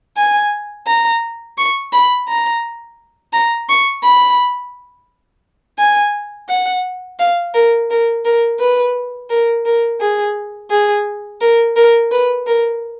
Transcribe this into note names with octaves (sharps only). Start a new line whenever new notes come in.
G#5
A#5
C#6
B5
A#5
A#5
C#6
B5
G#5
F#5
F5
A#4
A#4
A#4
B4
A#4
A#4
G#4
G#4
A#4
A#4
B4
A#4